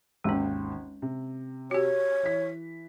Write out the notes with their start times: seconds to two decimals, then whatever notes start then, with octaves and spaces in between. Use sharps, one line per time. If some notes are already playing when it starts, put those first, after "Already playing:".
0.24 G#1 D#2 G#3 C#4 G5
1.02 C3
1.71 F#4 G4 C#5
2.23 E3 B6